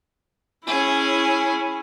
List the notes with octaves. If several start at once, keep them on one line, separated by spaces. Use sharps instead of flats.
C#4 E4 G#4